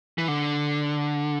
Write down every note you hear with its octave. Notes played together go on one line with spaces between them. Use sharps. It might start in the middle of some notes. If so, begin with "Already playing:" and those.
E3
D3